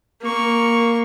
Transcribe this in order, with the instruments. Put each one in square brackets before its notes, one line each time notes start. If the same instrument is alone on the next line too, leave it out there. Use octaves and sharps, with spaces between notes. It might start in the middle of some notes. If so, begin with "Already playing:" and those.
[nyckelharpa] A#3 C#6